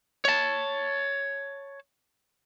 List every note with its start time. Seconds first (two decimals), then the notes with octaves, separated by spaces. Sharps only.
0.25 C#5 A5